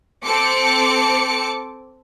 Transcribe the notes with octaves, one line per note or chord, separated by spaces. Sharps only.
C4 A4 D6 C#7